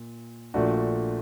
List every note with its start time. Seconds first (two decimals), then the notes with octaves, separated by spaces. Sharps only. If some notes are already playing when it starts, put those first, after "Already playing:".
Already playing: A#2
0.54 A#1 A#2 A3 D4 F#4